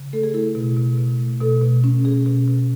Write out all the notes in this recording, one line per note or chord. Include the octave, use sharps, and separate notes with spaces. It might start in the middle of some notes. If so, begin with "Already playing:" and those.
Already playing: C#3
A3 A4
G#4
E4 A4
B2
B2
B2
A3
B2 A4
B2
C#4
B2 G#4
B2
B2